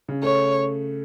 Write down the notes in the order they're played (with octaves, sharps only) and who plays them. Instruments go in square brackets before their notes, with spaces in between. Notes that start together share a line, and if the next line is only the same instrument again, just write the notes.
[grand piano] C#3
[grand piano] A3 [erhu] C#5